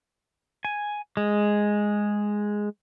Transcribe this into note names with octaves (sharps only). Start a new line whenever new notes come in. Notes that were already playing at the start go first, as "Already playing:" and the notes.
G#5
G#3